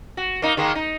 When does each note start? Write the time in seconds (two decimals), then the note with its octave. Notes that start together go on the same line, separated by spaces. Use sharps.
0.17 F#4
0.42 A#3 D#4
0.57 D#3 G#3 A#3
0.75 D#4